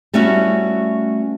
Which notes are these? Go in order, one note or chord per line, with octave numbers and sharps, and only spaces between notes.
G3 A3 B3 C#4 E4 F#4